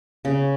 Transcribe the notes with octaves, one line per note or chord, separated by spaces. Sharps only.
C#3